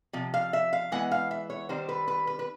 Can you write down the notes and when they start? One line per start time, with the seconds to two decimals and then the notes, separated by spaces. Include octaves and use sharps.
0.13 C3 F3
0.34 F5
0.53 E5
0.73 F5
0.92 E3 G#3 B3 F#5
1.11 F5
1.31 E5
1.50 C#5
1.69 D#3 G3 C4 C5
1.89 B4
2.08 B4
2.27 B4
2.39 B4